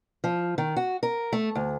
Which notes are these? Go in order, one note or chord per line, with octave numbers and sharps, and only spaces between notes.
F3
D#3
F#4
A#4
A3
D2